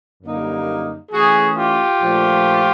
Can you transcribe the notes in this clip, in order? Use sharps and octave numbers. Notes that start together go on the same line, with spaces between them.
F#2 D3 G3 A#3 D#4
E3 A3 C#4 F#4 G#4
F4 G4
A#2 F3 A3 D4